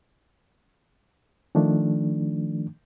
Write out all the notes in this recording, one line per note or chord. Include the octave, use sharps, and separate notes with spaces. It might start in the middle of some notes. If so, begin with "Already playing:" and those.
D#3 F3 A3 D4